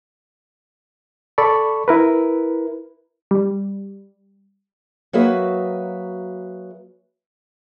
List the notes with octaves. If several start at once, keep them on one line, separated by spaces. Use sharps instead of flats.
A4 D5 B5 C#6
E4 A#4 B4
G3
F#3 A#3 F#4 G#4 B4 E5